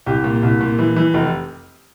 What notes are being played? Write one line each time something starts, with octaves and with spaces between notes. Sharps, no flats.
C2 G4
A#2
C2
A#2
E3
E3
F1